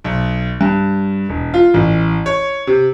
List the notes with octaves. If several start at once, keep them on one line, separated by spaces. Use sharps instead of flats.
B1
G2
E1
F4
A1
C#5
C3